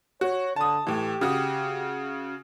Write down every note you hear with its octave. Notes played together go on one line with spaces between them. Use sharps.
F#4 C#5
D3 A5 D#6
A2 E3 G4
C#3 F#4 D#6